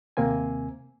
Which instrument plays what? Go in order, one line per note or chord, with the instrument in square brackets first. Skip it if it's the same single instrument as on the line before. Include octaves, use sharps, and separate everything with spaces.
[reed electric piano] D#2 C3 A#3 C4 G#5